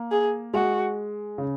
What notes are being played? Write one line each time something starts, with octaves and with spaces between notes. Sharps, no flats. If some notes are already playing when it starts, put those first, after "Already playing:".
Already playing: A#3
G#4
G#3 F#4
C#3